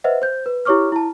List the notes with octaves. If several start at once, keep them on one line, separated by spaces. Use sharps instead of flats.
B4 C5 D#5 E5 F#5
C5 G6
B4
E4 G4 C#5 C#6 D6 F6
E4 A5